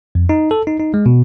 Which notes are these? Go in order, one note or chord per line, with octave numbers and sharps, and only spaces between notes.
F2
D#4
A4
D#4
D#4
G#3
B2